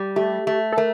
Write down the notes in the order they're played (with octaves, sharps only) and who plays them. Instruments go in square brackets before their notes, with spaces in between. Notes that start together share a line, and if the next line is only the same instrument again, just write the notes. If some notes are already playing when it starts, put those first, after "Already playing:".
Already playing: [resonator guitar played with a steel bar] G3
[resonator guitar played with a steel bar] A3 [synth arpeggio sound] G4
[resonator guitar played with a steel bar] A3
[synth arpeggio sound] A4
[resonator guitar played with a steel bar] A3 [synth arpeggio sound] A#4